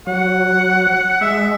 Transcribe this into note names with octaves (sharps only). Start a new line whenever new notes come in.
F#3 F#5
G#3 E5